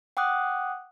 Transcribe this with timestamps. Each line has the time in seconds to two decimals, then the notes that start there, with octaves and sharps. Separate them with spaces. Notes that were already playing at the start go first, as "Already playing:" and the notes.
0.17 F#5 G5 D6 D#6 F#6